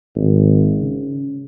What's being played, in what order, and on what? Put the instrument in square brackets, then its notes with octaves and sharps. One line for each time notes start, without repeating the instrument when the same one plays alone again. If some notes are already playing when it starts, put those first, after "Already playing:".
[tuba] G#1
C#3